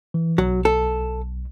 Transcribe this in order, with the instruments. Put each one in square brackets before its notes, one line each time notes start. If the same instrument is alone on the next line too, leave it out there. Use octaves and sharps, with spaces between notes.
[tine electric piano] E3
[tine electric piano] B1 [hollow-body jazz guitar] F#3
[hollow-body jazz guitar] A4